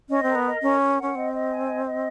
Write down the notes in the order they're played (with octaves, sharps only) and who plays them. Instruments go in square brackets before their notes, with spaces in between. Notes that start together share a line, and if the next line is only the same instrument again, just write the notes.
[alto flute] C#4 [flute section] D#5
[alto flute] C4 [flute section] A#4
[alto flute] B3
[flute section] D#5
[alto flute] C#4 [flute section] A#4
[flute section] A#4
F#5
[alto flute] C#4
[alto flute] C4 [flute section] D#5
[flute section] D#5
G#5
D#5
D#5